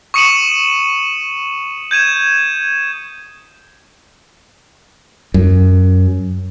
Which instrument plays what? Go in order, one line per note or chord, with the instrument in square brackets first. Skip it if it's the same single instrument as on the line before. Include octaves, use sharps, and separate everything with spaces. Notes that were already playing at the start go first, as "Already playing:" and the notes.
[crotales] C#6 D#6 C#7 D#7 E7 F#7
G6 G#6 D#7 E7
[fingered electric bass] F#2